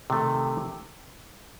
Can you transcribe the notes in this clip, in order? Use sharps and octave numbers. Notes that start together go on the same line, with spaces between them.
C3 D#3 A3